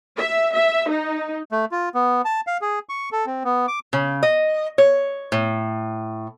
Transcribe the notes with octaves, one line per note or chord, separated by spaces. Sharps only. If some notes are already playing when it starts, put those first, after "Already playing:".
E5
E5
D#4
A3
F4
B3
A5
F5
G#4
C#6
A4
C4
B3
D6
C#3
D#5
C#5
A2